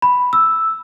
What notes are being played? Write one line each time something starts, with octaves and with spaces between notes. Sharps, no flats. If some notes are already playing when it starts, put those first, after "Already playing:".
B5
E6